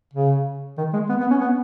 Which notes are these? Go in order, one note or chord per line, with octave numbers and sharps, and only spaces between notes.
C#3
D#3
G#3
B3
B3
C#4
B3